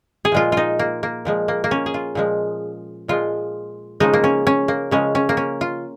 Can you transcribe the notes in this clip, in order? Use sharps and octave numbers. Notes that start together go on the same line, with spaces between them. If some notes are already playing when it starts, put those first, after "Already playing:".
G#4
A#2 F3 G#3 F4
D#4 F4
A#3
A#3
A#2 F3 G#3
A#3
A#3
C#4
G#4
F4
A#2 F3 G#3
A#2 F3 G#3 F4
C#3 F3 G#3 D#4
A#3
C#4
C#4
A#3
C#3 F3 G#3 C#4
C#4
A#3
C#4
F4